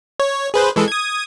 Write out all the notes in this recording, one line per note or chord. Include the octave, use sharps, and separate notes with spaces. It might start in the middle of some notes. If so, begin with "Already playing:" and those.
C#5
G#4 B4 C5
E3 G#3 A4
D#6 G#6